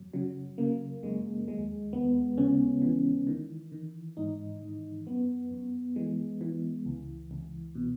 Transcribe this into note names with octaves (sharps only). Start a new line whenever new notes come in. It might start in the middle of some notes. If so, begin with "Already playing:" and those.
Already playing: F#2 F#3
C#3 F#3
C#3 A#3
F#2 G#3
D#2 G#3
D#2 B3
C#3 C#4
E3
D#3
D#3
G#2 D#4
G#2
F#2 B3
F#2
E3 G#3
E3
C#2
C#2
B2